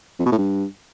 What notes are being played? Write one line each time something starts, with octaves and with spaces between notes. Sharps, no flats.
F2
B2
A2
G2